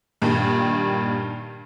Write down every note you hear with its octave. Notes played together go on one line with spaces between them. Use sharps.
G2 A#2 D#3